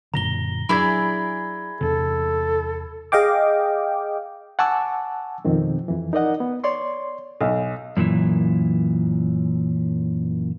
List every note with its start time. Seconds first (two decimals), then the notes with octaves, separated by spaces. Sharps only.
0.14 F#2 A#2 D3 A#5 A#6 G7
0.69 F#3 D4 E4 G#4 D5 B5 G#6
1.81 E2 C3 A4
3.12 G#4 D#5 F5 G5 D6
4.59 F#5 G#5 A5 C#6 D6 E6
5.45 F2 B2 D#3 C4
5.88 F2 E3
6.13 D#4 A#4 D5 D#5 F#5
6.40 B3
6.64 C#5 D5 C6 C#6
7.41 B1
7.97 F#2 A#2 D3 E3